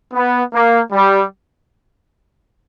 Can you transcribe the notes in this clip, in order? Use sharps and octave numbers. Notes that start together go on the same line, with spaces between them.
B3
A#3
G3